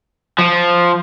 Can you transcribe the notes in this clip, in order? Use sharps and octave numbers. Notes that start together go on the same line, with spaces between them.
F3